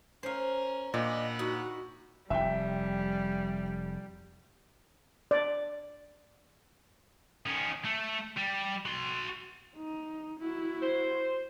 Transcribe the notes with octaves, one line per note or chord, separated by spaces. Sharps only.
C#4 A#4 C5 F5
A#2 D4 D#5 F#5 B5
D#4 F#4
F1 G3 E5 G5
D5
D#3 C#4
A3
G3
F#4 C6
D#4
E4 F#4
C5